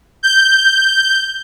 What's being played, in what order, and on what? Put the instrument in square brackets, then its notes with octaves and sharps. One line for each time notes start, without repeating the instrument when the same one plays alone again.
[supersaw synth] G6